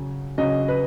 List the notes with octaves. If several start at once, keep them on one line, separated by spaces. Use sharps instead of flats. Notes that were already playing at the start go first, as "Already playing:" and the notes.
Already playing: C#3 F#3 C#4
C#3 F#3 C#4 D#5
B4